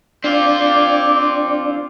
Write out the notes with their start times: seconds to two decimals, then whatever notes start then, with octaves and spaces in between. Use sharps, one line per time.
0.24 C4 D4 F4 D5 D6